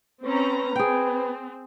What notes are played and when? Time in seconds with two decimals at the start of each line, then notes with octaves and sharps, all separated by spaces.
0.24 C4 C#4 B4 A#5
0.76 C4 G#4 G5